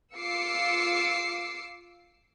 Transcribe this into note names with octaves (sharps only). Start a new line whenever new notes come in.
F4 D6 E6 C7 C#7